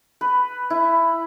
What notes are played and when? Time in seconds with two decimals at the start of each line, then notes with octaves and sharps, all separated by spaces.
0.21 B4
0.70 E4